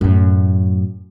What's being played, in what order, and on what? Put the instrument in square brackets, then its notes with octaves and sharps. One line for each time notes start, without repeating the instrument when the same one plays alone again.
[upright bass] F#2 A2